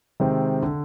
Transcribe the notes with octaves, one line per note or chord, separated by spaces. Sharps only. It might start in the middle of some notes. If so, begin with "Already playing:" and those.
C3 D#3 G#3 C4
D3